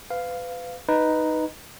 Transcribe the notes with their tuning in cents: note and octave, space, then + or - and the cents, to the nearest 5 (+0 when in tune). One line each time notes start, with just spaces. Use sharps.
B4 +30 F5 +0
D#4 +0 B4 +0